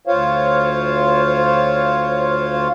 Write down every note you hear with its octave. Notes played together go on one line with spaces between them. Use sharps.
D2 F4 C5 C#5 F5